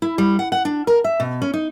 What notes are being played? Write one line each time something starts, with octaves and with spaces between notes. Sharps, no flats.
E4
G3
F#5
F#5
D4
A#4
E5
B2
C#4
D#4